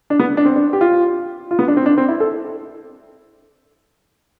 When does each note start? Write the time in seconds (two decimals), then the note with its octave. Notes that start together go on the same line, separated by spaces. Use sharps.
0.10 D4
0.19 B3
0.37 D4
0.45 C4
0.56 D4
0.73 G4
0.81 F4
1.51 F4
1.59 B3
1.68 D4
1.77 C4
1.86 D4
1.98 C4
2.08 E4
2.20 A4